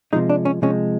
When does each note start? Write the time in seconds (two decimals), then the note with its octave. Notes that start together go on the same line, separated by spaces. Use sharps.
0.13 C3 F3 G#3 D#4
0.29 D4
0.45 C#4
0.62 C3 F3 G#3 C#4